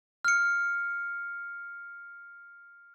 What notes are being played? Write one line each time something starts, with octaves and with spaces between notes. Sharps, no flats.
F6 C#7